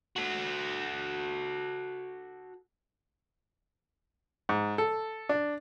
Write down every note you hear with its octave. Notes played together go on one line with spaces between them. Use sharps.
F#4 A4
G#2
A4
D4